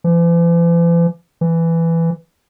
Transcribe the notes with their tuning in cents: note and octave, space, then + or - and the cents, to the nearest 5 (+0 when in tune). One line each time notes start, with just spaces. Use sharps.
E3 +45
E3 +10